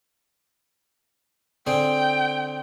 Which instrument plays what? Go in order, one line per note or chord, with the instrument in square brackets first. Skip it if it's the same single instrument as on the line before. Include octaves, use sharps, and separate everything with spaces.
[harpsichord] D3 C4 G#4 [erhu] G5